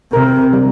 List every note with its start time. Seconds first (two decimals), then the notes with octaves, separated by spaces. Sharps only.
0.12 C3 A#4
0.53 G3